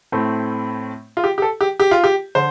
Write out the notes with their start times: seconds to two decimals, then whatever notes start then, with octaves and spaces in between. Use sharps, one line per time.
0.12 A2 A3 C4
1.17 F4
1.24 G4
1.38 G4
1.42 A4
1.61 G4
1.80 G4
1.91 F4
2.04 G4
2.35 D3 C5